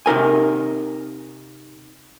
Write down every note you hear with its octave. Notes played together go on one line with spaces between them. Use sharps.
C3 D#4 A#4 G#5